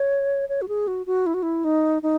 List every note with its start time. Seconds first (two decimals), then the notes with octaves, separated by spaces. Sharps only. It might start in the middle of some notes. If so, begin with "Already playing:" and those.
Already playing: C#5
0.49 C#5
0.62 F#4
0.68 G#4
0.88 F#4
1.06 F#4
1.26 E4
1.34 F#4
1.43 E4
1.64 D#4
2.03 D#4